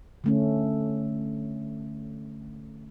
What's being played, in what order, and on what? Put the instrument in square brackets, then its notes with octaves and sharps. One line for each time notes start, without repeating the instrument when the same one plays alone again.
[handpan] D3 A3 C#4